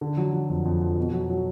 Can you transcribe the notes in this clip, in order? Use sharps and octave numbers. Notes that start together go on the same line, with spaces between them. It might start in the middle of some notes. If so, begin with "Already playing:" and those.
D3
F#3
F#3
F2
F2
F2
B2
F#3
F#3